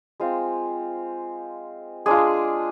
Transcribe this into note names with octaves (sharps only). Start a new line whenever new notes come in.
G#3 C4 F4
G#3 D4 F4 G#4